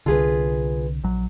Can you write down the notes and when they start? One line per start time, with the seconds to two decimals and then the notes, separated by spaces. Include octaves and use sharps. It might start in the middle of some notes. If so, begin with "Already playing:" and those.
0.06 C2 D3 F4 G#4 B4
1.04 A#1 F#3